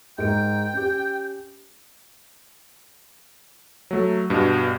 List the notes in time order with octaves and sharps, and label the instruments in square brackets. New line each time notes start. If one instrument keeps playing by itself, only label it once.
[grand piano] G#2 A#4 D7 [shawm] G5
[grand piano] C#4 G4
[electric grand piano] F#3 A3
G2 B2